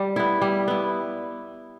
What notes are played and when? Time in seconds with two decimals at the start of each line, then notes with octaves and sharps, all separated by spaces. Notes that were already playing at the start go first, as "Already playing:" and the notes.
Already playing: G3
0.16 B3 E4
0.42 G3
0.68 B3 E4